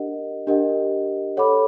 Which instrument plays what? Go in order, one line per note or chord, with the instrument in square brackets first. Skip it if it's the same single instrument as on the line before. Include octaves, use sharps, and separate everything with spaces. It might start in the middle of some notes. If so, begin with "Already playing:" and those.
Already playing: [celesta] D4 G4 A#4 D#5 F#5
D4 G4 A#4 D#5 F#5
A4 C#5 F#5 B5 D6